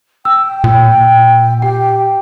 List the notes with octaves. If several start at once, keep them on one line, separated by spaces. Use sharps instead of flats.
G5 E6
A#2
G4 G5